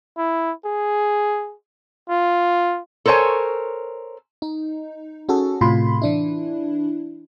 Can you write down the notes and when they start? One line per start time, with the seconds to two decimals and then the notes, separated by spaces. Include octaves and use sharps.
0.18 E4
0.65 G#4
2.09 F4
3.06 A4 A#4 C5 C#5 G#5
4.42 D#4
5.29 C#4 F#4 G#4 A4
5.61 A2 C3 F4 B5 C6
6.02 E3 D4 E4